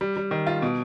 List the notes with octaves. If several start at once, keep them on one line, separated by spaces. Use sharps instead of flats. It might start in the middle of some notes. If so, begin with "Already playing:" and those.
G3
G3
D#3
F4
B2